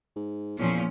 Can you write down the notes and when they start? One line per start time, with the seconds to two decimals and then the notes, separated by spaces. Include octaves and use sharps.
0.16 G#2
0.58 E2 A#2 F3 C#4